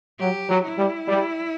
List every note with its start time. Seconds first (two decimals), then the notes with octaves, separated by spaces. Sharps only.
0.19 F#3 G4
0.49 F#3
0.64 E4
0.78 G3
1.08 G3